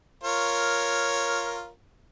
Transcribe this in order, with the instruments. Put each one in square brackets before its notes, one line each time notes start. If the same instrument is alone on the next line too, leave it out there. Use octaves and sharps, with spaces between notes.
[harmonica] F4 A#4 C#5